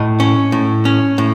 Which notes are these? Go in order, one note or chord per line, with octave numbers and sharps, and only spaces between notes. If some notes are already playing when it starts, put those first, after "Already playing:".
Already playing: A2 D#5
C#4
A2
C#4
A2